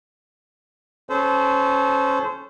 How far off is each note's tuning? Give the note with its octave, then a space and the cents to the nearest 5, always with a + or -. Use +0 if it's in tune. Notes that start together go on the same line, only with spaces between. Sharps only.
C#4 -15 A4 -30 C5 -25